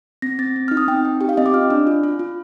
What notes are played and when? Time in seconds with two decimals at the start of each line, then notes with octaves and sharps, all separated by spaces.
0.22 C4 A#6
0.39 C4 A6
0.56 C4
0.68 D#4 F6
0.77 D#6
0.88 C4 G5
1.05 D#4
1.21 G4 G5
1.29 F5
1.37 C4 D#5
1.46 D6
1.54 F4 F6
1.70 D4
1.87 F4
2.04 F4
2.19 F4